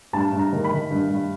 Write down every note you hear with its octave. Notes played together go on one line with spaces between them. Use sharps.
G2 A5
G2
A#5
D#3
B5
D#3
G2
G2